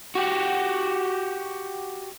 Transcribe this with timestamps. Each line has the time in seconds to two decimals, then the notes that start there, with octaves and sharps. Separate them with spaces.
0.15 F#4 G4